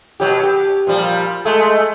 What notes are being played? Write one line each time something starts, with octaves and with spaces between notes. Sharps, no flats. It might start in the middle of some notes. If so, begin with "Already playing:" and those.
B2 F#3 G4
G4
A#2 F3 G3
G#3 A3